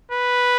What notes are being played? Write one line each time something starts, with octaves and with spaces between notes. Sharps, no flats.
B4